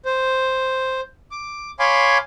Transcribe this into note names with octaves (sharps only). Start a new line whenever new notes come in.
C5
D6
C#5 F5 G#5 B5 C6 D6